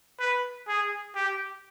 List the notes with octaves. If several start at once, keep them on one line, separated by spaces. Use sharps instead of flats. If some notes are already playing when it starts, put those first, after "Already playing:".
B4
G#4
G4